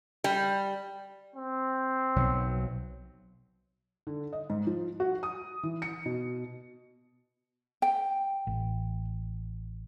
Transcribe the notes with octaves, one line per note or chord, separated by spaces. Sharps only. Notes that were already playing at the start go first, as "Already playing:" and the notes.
G3
C4
B1 F#3
D3
D#5
G#2
F3
F#4
D#6
E3
C#7
B2
G5
A1